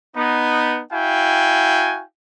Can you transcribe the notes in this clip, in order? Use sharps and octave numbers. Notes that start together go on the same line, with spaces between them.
B3 D#4
E4 F#4 F5 G5 G#5